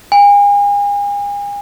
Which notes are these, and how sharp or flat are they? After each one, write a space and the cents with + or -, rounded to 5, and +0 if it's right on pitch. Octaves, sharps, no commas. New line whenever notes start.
G#5 -40